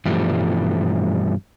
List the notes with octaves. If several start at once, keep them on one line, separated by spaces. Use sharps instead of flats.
G2 B2 E3 F3 G3 A3